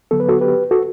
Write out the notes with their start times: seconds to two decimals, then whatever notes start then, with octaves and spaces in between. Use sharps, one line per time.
0.11 D3 F#3 B3 A4
0.20 B4
0.29 F#4 A4
0.41 G4 B4
0.71 F#4 A4